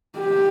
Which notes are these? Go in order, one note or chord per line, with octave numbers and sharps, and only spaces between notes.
G4